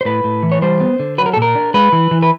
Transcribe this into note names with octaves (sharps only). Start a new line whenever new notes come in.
C5
A2 B4
A2
E3
C#5
G3 C5
B3
D3
F#3 B4
A#4
A4
A#2
A#4
D4
G#3 B4
E3
E3
B4